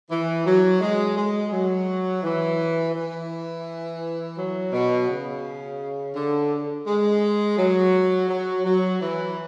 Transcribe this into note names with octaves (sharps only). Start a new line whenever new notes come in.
E3
F#3
G#3
G#3
F#3
E3
E3
F#3
B2
C#3
D3
G#3
F#3
F#3
F#3
E3